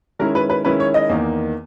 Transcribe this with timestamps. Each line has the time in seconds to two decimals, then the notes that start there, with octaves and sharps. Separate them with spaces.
0.19 D#3 G#3 C#4 E4 A#4
0.35 B4
0.50 B4
0.65 D#3 G#3 C#4 E4 B4
0.80 C#5
0.94 D#5
1.09 E2 D#3 A#3 D#4